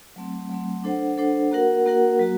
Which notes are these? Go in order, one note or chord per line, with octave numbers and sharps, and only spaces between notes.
F#3 A3 C4
F#3 A3 C4
D4 A4 C5 F#5
D4 A4 C5 F#5
A#3 F#4 A#4 F#5
A#3 F#4 A#4 F#5
F#3 A#3 F#4